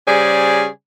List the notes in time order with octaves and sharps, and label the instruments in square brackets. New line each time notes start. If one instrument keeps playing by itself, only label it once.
[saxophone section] C#3 G3 C#4 G#4 C5 D5